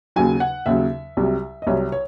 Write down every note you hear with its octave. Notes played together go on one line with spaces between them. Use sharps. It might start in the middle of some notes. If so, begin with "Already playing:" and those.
D#2 C#3 F#3 G#5
F#5
D#2 C#3 F#3 E5
C2 C3 F#3
D#5
C2 C3 F#3 C#5
C#5